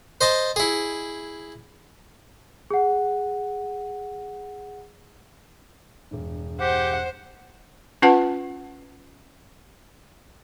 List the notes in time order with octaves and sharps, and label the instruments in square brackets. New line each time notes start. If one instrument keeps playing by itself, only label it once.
[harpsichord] C5 D#5 A5
E4 G#4
[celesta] G#4 F#5
[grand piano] E1 G2
[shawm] G4 [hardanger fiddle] C5 [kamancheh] F#5
[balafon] C#4 F4 B4 F#5 A5